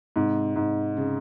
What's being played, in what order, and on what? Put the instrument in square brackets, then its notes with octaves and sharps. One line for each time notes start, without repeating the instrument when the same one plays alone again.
[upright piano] G#2 [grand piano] C3
[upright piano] G#2
[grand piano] C#3